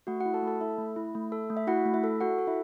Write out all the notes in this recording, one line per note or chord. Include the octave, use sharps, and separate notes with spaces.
A3 F#4 F#5
F#4 F#5
E4
A4 A5
A3
A4 A5
E4 A4 E5
A3
E4
A3
A4
A3
E5
E4 F#4 F#5
A3
E4 E5
A4
F#4 A4 F#5
A4
E4 E5